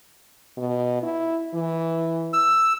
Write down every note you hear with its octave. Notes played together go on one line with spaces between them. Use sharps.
B2
E4
E3
E6